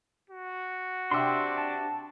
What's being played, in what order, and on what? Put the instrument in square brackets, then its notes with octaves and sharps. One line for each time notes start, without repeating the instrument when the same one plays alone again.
[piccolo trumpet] F#4
[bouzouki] C3 G4 E5 [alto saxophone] D4 [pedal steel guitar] C6 E6
[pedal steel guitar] A5